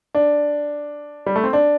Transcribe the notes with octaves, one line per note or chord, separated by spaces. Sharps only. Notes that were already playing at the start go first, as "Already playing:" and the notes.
D4
G3
A3
C4
D4